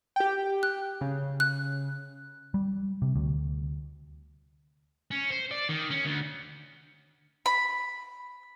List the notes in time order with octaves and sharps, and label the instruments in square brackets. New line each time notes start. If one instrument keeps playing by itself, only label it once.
[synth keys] G4 G5
[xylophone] F#6
[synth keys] C#3
[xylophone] F#6
[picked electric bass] G3
C3
D2
[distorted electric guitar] C#4
C5
D5
D#3
C#4
D2
[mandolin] B5